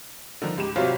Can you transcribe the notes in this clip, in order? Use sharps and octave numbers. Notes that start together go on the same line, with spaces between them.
D3 D#3 F3
C#2 G#2 G4 E7
G#1 C3 F#3 F4 G4 C5 C#5